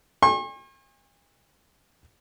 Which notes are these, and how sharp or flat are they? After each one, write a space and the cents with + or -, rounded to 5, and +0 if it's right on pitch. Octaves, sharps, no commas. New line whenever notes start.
G#5 -45 C#6 -45